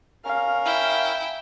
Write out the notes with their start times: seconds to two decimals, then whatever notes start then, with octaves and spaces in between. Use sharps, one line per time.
0.25 C#4 A#4 F5
0.65 E4 G5